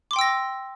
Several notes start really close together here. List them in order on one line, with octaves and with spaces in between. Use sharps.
D6 C6 G5 E6 A#6